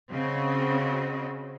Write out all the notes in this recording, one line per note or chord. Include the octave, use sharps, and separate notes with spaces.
C#3 C4 F#4 D#5